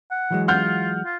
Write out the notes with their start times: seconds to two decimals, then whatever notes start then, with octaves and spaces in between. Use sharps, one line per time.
0.11 F#5
0.31 E3 F#3 G#3
0.48 F4 F#5 F6 G6
1.05 F4